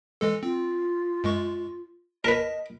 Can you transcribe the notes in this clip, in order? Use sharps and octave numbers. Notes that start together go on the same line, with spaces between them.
E3 G#3 A4
C4 F4
F#2 G#3 C#6
A#4 B4 D#5 A5 A#6 B6